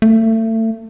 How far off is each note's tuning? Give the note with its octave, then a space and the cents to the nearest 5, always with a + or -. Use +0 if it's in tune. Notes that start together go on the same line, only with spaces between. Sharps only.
A3 +30